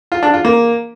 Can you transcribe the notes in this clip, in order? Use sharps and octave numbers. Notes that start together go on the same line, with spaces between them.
F4
D4
F4
A#3